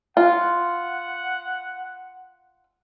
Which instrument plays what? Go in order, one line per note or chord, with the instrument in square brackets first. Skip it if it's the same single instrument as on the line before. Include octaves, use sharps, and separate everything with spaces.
[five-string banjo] F4 [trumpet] F#5